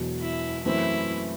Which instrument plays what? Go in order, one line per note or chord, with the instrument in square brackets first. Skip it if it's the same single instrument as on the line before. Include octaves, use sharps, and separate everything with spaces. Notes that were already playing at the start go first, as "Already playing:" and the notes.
Already playing: [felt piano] E1 E2 B2 F#3
[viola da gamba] E4
[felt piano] F#2 E3 A3 C4 [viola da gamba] E4